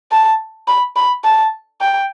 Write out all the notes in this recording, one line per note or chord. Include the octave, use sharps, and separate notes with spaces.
A5
B5
B5
A5
G5